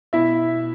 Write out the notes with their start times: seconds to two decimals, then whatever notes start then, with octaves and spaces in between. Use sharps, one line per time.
0.13 B2 E4 E5